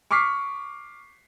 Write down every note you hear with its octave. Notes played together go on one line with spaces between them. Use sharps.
C#6 D6 F6 B6 C7